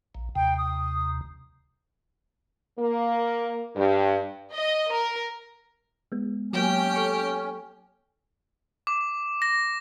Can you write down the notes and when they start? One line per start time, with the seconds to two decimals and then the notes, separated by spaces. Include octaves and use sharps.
0.15 A#1
0.36 D#2 C3 G5
0.58 D#6
2.79 A#3
3.76 G2
4.54 D#5
4.93 A#4
6.12 G#3 B3
6.53 F#3 A#3 C#4 G4 G5
6.95 A4 C#6
8.87 D6
9.42 A#6